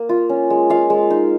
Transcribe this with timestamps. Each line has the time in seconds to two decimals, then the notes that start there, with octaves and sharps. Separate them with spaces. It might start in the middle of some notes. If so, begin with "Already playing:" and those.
Already playing: A#3
0.09 F4
0.29 C#4
0.50 G#3
0.70 F4 F5
0.90 G#3
1.10 D#4